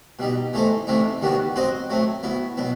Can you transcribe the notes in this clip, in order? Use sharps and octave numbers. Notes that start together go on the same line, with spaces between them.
B2 G3 D#4
E3 A3 D#4 A4 C5
C3 E3 A3 C4 D#4
D#2 D#3 G3 B3 F#4
F#3 C4 F#4 C5 D#5
F#3 A3 C4
F#3 B3 E4
B2 F#3 B3